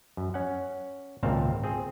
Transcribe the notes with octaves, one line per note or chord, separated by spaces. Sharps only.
F#2
C#4 F#5
G#1 C#2 A#2 C4 F5 A5
C4 G#4